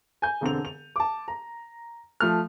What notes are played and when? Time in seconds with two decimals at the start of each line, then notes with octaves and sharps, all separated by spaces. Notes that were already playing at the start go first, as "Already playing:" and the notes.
0.22 G#5 G6
0.41 E1 D3 C4 F7
0.65 F7
0.96 A5 D6
1.28 A#5
2.20 F3 A3 F6